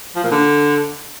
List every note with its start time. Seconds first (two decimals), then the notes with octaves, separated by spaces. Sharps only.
0.16 F3
0.24 A#2
0.31 D3